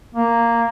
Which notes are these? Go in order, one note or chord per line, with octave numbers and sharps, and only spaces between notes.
A#3